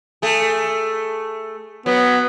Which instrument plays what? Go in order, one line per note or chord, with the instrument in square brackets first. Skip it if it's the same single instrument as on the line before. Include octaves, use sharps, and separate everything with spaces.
[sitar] A3 G#4
[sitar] F#3 [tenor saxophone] B3